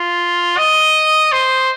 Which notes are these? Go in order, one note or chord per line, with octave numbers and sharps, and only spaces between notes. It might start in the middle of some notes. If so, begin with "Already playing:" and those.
Already playing: F4
D#5
C5